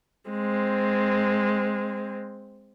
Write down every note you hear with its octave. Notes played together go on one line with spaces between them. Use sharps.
G#3 C4